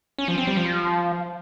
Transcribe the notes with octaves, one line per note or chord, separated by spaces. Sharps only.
C#4
F3
C4
G3
F3